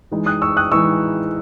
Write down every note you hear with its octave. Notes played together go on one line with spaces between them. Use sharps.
E3 G#3 D#4
D#6 F#6
C#6 E6
D#6 F#6
E3 G#3 D#4 C#6 E6